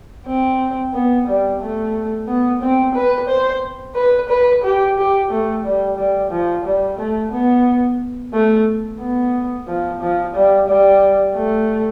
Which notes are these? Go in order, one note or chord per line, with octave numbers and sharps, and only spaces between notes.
C4
B3
G3
A3
B3
C4
B4
C5
B4
B4
G4
G4
A3
G3
G3
F3
G3
A3
B3
A3
B3
F3
F3
G3
G3
A3